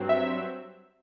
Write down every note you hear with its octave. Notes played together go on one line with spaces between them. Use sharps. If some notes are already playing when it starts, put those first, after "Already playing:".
Already playing: G2 F#3 C4
E5